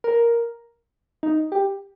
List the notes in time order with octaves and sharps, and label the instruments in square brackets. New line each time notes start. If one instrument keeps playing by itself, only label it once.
[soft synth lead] A#4
D#4
G4